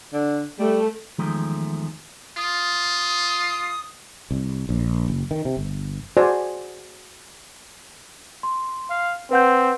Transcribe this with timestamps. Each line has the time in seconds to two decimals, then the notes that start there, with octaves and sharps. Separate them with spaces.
0.13 D3
0.59 G3 A3
1.18 E2 D#3 F3 G#3 A3
2.38 F4 D#6
4.31 C2
4.69 A#1
5.08 F#1
5.31 D#3
5.45 C3
5.57 G1
6.17 F#4 G#4 C5 D5 G#5
8.43 C6
8.90 F5
9.31 C4 B4 F#5 G6